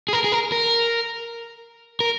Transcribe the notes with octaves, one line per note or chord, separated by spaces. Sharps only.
G#4
A#4
G#4
A#4
A#4
A#4